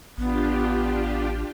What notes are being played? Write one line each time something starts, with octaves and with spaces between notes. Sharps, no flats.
A1 B3 D4 F4 G4